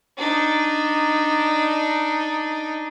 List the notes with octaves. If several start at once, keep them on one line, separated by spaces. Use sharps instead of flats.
D4 D#4